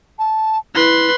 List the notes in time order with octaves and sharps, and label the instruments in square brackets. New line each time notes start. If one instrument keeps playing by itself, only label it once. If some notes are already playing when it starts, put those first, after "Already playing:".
[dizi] A5
[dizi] E4 [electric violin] B4 C6